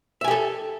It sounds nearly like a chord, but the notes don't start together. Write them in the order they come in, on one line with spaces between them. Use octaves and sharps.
E5 G#5 G4 A4